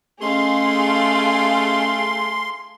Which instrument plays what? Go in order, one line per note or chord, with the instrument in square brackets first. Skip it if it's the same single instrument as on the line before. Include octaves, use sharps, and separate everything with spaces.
[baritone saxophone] A3 [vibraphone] C#4 D#5 [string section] G#4 F5 [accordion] C6